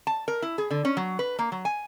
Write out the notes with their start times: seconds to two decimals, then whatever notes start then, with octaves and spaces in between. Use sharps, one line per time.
0.07 A5
0.28 A#4
0.42 E4
0.58 G#4
0.71 D3
0.85 C#4
0.97 F#3
1.19 B4
1.39 A#3
1.52 F#3
1.65 G#5